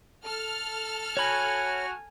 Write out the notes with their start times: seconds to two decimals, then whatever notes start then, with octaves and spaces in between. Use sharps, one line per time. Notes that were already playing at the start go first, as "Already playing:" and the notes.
0.24 A4 F6
1.17 F#4 C#5 G#5 B5